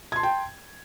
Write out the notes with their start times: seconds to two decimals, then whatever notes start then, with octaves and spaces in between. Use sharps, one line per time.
0.12 G#6
0.16 C6
0.20 A5
0.23 G5